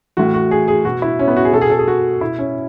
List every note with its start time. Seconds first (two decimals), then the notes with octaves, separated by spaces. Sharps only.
0.17 A2 E3 F#4
0.34 F#4
0.51 G#4
0.68 G#4
0.85 B2 F#4
1.02 E4
1.19 C#4
1.28 B3
1.37 F#4
1.45 G#4
1.53 B2 A4
1.61 G#4
1.70 A4
1.79 G#4
1.88 F#4
2.21 B2 E4
2.39 C#4